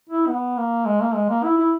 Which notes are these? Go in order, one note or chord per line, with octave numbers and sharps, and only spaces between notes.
E4
B3
A#3
G#3
A#3
G#3
A#3
E4
E4